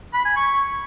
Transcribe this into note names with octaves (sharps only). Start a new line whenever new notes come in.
B5
G#5
C#6